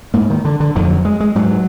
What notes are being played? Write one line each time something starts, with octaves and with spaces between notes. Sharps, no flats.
G#2 A#3
D#3
D3
D3
F2 D3 D#3
F#3
G#3
G#3
G#2 F#3